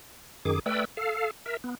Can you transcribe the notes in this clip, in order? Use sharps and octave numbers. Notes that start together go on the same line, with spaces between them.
F#2 D#3 G#4 D6
A3 B4 D5 G5 E6
A4 F5
A#4 E5
B3